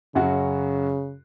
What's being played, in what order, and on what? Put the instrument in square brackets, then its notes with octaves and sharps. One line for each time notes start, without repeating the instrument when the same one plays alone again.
[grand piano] F#2 F#3 F#4 [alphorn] C#3